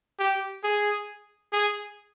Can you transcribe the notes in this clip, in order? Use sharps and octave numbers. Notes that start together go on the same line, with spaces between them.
G4
G#4
G#4